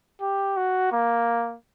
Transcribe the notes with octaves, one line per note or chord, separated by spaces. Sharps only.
G4
F#4
A#3